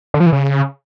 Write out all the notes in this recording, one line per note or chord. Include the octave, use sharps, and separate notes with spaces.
D3
F3
E3
C#3